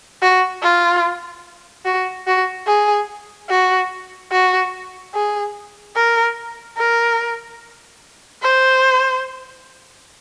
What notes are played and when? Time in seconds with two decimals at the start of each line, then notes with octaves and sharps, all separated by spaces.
0.22 F#4
0.63 F4
1.86 F#4
2.27 F#4
2.67 G#4
3.50 F#4
4.32 F#4
5.14 G#4
5.96 A#4
6.78 A#4
8.42 C5